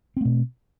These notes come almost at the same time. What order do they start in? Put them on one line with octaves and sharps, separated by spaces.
C4 A3 B2